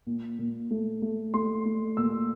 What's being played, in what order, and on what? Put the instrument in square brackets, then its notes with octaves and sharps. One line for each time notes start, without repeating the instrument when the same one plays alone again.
[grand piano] A#2
A#2
A3
A3
A3 C6
A3
A#2 E6